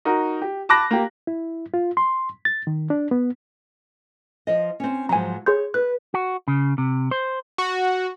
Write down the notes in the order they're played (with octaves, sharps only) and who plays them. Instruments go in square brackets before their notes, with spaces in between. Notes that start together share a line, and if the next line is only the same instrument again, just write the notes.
[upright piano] D#4 F#4 A#4
G4
A5 B5 D6 F#6 A#6
A#3 G4
[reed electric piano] E4
F4
C6
A6
D#3
D4
B3
[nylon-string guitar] F3 F4 D#5
C4 C#4
[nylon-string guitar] G#2 F3 F#3 [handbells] G#5 A#5
[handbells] G#4 C6 G6 [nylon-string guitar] C#5
[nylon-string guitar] B4 [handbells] F#6
[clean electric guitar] F#4
C#3
C3
C5
[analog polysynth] F#4